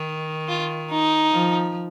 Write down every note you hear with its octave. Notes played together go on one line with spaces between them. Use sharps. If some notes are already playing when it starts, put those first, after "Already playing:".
Already playing: D#3
F4
D#4
F3